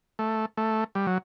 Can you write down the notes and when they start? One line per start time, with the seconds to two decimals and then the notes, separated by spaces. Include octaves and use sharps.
0.19 A3
0.57 A3
0.95 G3
1.07 F#3